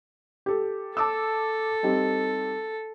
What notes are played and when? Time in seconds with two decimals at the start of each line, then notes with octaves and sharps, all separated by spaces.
0.46 G4 A4
0.97 A4 A5 D6 E6
1.83 G3 C4 D#4